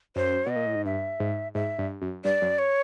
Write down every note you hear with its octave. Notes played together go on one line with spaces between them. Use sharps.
F#2 C5
B2 D#5
A#2
A2
G#2
G2 E5
G#2
G#2 E5
G2
F#2
G2 D5
F#2
C#5